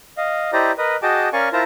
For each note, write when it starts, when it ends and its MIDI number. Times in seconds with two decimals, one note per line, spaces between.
0.17 0.51 75
0.17 0.51 77
0.53 0.72 64
0.53 0.72 67
0.53 0.72 72
0.53 0.72 74
0.53 0.72 75
0.53 0.72 82
0.78 0.96 70
0.78 0.96 71
0.78 0.96 75
1.02 1.29 66
1.02 1.29 68
1.02 1.29 75
1.02 1.29 79
1.02 1.29 81
1.02 1.29 86
1.33 1.49 61
1.33 1.49 70
1.33 1.49 74
1.33 1.49 77
1.33 1.49 80
1.33 1.49 85
1.53 1.64 64
1.53 1.64 65
1.53 1.64 70
1.53 1.64 72
1.53 1.64 81
1.53 1.64 82